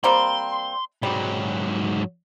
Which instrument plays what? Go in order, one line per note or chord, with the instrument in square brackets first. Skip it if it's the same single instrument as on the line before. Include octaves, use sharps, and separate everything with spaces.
[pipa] G3 A#3 C4 [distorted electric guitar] C6
[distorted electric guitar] G#2 F#3 [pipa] G3